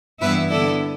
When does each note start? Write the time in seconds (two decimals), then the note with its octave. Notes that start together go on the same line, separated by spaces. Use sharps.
0.21 G2 E3 B3 E4 B4 E5
0.50 D3 B3 E4 A4 D5